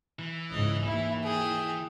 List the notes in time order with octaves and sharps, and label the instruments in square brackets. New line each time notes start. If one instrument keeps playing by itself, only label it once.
[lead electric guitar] E3
[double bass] C#2 G#2 [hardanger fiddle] D#5
[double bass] D#2 [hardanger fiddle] E4
[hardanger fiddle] G#4 G5